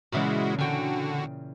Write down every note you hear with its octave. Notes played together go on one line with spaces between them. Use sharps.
A#2 C#3 E3 G#3 E4 F#4
D3 F#4 G5 G#5